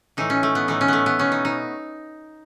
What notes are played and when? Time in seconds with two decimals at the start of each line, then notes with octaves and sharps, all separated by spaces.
0.17 A2 E3 A3 D#4
0.30 C#4
0.43 A3
0.55 B3
0.68 A2 E3 A3 D#4
0.81 C#4
0.88 A3 B3
1.06 B3
1.19 B2 A3 C#4
1.32 D#4
1.45 D#4